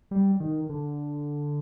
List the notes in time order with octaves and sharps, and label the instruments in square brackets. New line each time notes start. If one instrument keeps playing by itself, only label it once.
[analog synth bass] G3
D#3
D3